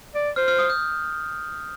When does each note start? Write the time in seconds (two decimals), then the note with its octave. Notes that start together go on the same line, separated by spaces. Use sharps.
0.15 D5
0.36 C5 F6
0.48 F6
0.59 D#6
0.70 G6